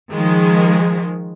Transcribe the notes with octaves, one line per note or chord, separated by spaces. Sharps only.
D#3 F3 G#3